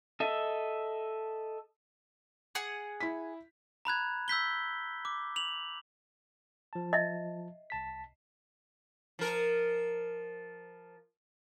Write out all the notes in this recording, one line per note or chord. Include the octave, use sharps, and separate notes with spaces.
A4 D#5 E5
G#4 F#5
E4 B6
A#5 B5 F#6 G#6
E6 G6 B6 G7
D6
F7 F#7
F3 A5
D#5 E5
C2 A5 B6
F3 A#4